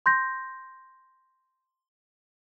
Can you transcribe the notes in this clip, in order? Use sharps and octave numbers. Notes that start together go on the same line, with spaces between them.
C6 G6 A#6